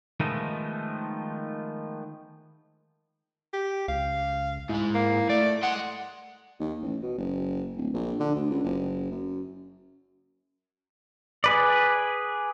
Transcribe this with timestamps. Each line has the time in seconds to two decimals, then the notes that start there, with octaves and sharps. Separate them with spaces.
0.20 D#3 F3 G#3 A3 B3 D#4
3.54 G4
3.88 C#2 F5
4.69 G#2 G#3 E4
4.94 A#3
5.29 A3 D5
5.63 D#5 F#5 C6
6.60 D#2
6.82 A1
7.02 B2
7.18 F#1
7.76 D1
7.93 A#1
8.19 D3
8.35 D2
8.50 C#2
8.64 F#1
9.11 F#2
11.44 G#4 B4 D5